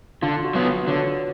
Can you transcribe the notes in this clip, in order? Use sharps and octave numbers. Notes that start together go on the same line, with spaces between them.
D3 F4
F#4
F#3 B3
B4
D3 C#5